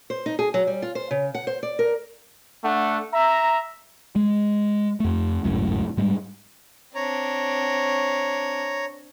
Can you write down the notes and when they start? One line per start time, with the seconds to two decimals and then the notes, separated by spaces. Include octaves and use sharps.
0.10 C5
0.26 D#4
0.39 G#4
0.54 F#3
0.67 G3
0.82 F4
0.95 C5
1.11 C#3
1.35 F#5
1.47 C5
1.63 D5
1.79 A#4
2.64 A3 D4 F#5
3.12 E5 A#5
4.16 G#3
5.00 F2 A3
5.44 G#1 C#2 F#2 A2
5.97 G#2 G3 G#3
6.95 C4 D4 C#5 A#5